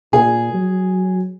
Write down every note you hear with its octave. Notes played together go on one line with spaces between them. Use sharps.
A#2 G#4
F#3